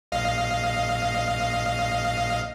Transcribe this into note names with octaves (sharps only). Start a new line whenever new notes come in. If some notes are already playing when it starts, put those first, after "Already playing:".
A#1 D#5 F5